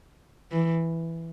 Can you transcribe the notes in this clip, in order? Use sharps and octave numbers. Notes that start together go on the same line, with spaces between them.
E3